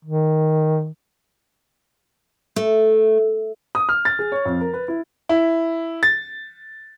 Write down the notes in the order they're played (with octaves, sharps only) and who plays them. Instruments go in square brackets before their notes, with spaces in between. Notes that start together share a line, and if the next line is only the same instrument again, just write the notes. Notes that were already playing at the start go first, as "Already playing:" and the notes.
[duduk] D#3
[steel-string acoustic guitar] A3
[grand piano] D#6
F6
A6
G#4
C#5
F2
A#4
B4
E4
E4
A6